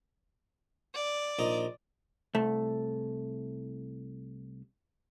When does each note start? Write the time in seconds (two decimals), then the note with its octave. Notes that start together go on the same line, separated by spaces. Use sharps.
0.95 D5
1.39 A#1 D#4
2.35 C2 A3